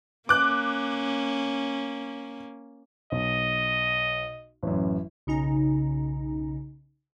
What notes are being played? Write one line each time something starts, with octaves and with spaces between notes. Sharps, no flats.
A#3 C#4 D6 F#6
B1 D#5
A1 F#2
B1 C#3 D#4 A#5